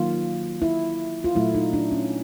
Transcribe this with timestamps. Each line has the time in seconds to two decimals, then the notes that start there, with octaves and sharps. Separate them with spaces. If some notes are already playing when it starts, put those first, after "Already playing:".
Already playing: D#3 F#3 A#3 F4
0.62 E4
1.24 F4
1.36 A#2 F#3 A3 E4
1.54 D#4
1.73 D4
1.92 C#4